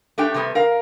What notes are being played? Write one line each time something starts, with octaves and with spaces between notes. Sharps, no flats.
A3 D4 G4 G5
C3 G3 A3 B3
A#4 F5